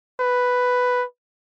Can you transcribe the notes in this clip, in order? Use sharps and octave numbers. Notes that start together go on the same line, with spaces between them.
B4